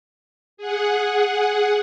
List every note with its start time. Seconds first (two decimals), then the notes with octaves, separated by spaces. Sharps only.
0.57 G#4 F#5